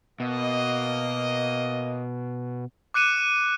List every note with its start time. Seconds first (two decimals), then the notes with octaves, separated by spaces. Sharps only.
0.20 B2 A#3 D#5
2.94 D6 F#6 C#7 D#7 E7